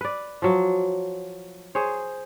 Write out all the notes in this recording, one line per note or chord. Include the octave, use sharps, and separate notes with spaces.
B4 D5
F3 F#3
G#4 C5 C#5